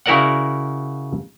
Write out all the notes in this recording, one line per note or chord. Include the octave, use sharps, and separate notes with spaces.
C#3 E4 F#4 A#4 D5 F#5